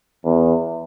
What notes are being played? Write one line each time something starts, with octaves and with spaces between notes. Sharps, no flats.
E2